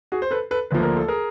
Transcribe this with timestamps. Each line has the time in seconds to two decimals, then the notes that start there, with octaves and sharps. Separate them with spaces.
0.12 F#4 G#4
0.22 C5
0.31 A4 B4
0.51 A4 B4
0.71 D2 D3 F3 A#3 B4
0.83 A#4
0.97 A4
1.08 G#4 A#4